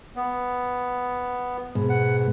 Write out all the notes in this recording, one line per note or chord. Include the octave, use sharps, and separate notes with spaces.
B3
G#2 B2
F#5